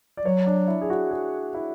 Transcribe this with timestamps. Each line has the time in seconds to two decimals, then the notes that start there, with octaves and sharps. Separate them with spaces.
0.17 D5
0.25 F#3 C#5
0.46 D4
0.68 E4
0.81 G#4
0.90 F#4
1.11 G#4
1.54 E4